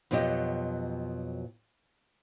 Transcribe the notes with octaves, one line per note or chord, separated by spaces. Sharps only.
F2 B2 F#3 F4 G4 D#5